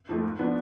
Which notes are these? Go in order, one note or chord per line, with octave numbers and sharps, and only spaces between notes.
F2 F3 A3
G#2
F3 B3 D4